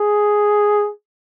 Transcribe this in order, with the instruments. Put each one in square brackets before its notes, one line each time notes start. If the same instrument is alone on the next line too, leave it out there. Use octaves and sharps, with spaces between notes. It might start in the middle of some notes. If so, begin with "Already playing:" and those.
Already playing: [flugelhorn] G#4